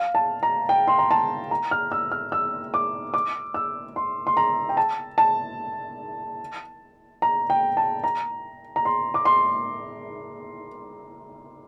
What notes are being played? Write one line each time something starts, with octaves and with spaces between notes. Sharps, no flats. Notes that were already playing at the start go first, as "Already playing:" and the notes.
Already playing: F5
A5
A#5
G5
C6
A#5
A5
A#5
F6
E6
F6
E6
D6
D6
E6
C6
C6
A#5
G5
A5
A5
A#5
G5
A5
A#5
A#5
C6
D6
C6